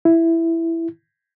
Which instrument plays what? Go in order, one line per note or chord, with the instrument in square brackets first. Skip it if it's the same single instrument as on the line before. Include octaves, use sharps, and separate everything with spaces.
[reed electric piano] E4